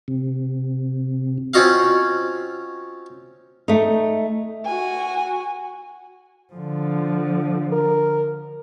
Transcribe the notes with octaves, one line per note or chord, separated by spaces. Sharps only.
C3
C4 C#4 F4 F#4 D#5 F5
A3 D#4
F#4 G#5
D3 F3
A#4